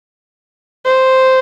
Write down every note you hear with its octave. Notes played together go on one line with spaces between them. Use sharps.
C5